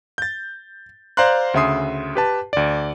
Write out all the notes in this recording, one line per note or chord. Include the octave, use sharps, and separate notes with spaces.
G6 A6
C5 D5 F5 A#5 C6 F#6
D2 C#3 E5 C6 D#6 C7
G4 B4 A5
D2 D5